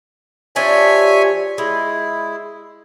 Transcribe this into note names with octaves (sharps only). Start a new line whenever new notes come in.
F3 D4 G4 C#5 E5 G#5
G#3 E4